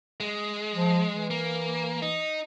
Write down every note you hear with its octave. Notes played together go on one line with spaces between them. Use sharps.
G#3
F3
E3
A#3
D#4